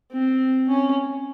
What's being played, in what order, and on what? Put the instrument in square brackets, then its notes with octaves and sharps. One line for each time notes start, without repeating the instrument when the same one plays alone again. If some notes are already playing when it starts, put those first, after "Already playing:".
[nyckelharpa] C4
C#4